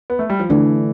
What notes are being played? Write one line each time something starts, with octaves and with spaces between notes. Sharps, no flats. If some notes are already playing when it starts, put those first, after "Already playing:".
B3
A3
G3
F3
D3 E3 A3 D4